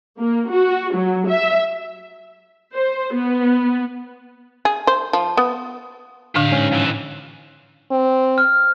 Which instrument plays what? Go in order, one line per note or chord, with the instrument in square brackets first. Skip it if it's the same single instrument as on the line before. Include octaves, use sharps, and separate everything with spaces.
[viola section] A#3
F#4
F#3
E5
C5
B3
[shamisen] G#4
C5
F3
B3
[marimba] A2 D3 D4 [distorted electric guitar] G4 F5
[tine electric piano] G#2 C#4
[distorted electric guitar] F2 E3
[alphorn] C4
[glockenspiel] F6